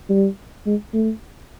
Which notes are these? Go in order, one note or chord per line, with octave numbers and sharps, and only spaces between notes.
G3
G#3
A3